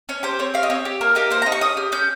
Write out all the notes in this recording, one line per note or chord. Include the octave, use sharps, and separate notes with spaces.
C#4 C#5
G4 C5
C4 C#5
G4 F5
D#5
C4 C#5
G4
A#3 A#4
D#4 G4 A#4
A#3 C5
D#4 G4 A#5
C#6
C#4 D#6
G4
C#4 G6